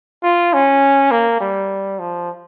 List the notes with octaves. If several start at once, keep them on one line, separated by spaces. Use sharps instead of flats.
F4
C#4
A#3
G3
F3